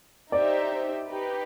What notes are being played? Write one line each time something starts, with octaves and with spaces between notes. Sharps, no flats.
D#4 G4 C5 D5 E5
D#4 G4 B4